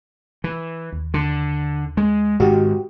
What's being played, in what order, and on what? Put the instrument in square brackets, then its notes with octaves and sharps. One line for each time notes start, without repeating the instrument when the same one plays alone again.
[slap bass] E3
[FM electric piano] D#2
[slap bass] D3
G#3
[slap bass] G#2 D#3 [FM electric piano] F#4 G4